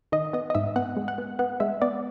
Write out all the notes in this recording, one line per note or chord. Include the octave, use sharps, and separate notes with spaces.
D#3 D#5
B3 D#5
D#5
G#2 E5
B3 F#5
G#3
F#5
B3
B3 F#5
G#3 E5
B3 D5